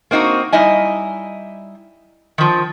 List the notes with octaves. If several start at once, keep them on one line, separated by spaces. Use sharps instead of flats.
A#3 C4 D#4 F4 F#4
G3 D#4 E4 D#5 G#5
D#3 F3